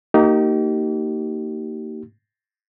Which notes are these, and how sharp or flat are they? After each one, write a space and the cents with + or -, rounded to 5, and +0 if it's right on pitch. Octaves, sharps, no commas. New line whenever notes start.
A#3 -25 D#4 +0 G4 -35